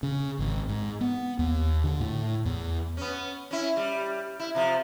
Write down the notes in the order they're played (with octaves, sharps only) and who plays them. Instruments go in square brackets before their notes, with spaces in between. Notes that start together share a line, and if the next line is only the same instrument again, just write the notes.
[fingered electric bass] C#3
G#1
G#2
B3
D#2
D3
A2
E2
[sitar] B3 C#4
C#4 E4
G3
E4
C3 F3